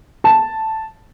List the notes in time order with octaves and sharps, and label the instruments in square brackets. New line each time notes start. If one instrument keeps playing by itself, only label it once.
[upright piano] A5